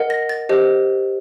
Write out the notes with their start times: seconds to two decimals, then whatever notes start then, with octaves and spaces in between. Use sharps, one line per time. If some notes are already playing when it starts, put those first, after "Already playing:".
Already playing: A#4 D#5 F#5
0.10 A#6
0.29 A6
0.49 G4 C5 D#5